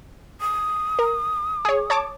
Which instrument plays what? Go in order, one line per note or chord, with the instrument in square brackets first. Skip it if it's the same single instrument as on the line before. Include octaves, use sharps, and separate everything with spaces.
[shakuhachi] D#6
[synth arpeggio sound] A#4
G#4 C#5
C#5 A5 D6